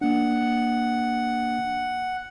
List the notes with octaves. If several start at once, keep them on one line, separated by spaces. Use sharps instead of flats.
A#3 D4 F#5